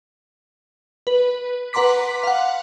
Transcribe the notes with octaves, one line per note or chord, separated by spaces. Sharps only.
B4
B4 F#5 A#5 C6 D6 B6
F5 F#5